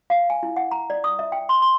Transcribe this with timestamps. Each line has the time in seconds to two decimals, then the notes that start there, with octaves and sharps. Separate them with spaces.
0.10 F5
0.30 G#5
0.43 E4
0.56 F#5
0.71 A#5
0.90 D5
1.04 D#6
1.19 E5
1.32 G5
1.49 C6
1.62 C6